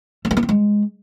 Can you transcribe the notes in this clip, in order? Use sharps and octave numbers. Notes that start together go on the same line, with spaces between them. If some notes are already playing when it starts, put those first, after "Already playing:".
A3
G#3
B3
C4
G#3